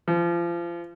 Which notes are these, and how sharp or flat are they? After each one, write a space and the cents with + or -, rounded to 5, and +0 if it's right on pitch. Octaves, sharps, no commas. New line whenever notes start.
F3 -30